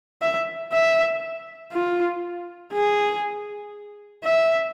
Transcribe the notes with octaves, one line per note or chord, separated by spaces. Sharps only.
E5
E5
F4
G#4
E5